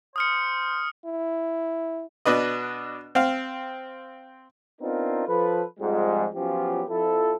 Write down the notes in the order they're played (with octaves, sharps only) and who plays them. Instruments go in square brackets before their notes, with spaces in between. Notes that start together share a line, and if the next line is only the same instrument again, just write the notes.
[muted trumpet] C5 [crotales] D#6 F6 C#7
[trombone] E4
[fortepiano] B2 D4 B4 D#5
C4 F5
[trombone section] B3 C4 D4 D#4 F4 A#4
F3 A4 B4
F2 G#2 F3 G3 G#3
F3 F#3 B3 C#4 F4 G4
F2 F3 E4 A4